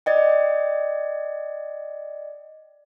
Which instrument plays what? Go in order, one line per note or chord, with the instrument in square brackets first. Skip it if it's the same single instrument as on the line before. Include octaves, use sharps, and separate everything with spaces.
[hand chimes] D5 D#5 G5